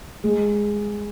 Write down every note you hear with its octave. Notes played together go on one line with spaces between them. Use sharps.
G#3